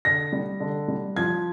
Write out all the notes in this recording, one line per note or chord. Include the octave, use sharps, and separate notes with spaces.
D3 A#6
G3
D3
G3
F3 G#6